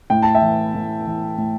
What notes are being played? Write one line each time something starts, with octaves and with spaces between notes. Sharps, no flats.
A2 G5
A5
E5 G5
E3
A2
E3
A2